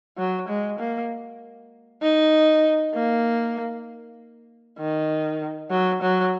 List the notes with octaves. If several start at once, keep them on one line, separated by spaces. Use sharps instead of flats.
F#3
G#3
A#3
D#4
A#3
D#3
F#3
F#3